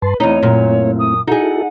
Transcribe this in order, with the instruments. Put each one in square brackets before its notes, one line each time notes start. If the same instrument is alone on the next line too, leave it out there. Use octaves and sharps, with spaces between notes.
[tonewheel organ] G2 A5 C6 [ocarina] B4
[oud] E2 D#4 [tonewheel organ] A3 C4 E4 [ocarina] C#5
[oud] F#2 A#2
[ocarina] D#6
[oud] D#4 G#4 [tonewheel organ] E4 F#4 A4 [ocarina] F#5